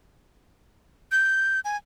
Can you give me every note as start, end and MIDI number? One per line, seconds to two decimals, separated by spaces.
1.12 1.60 91
1.65 1.77 80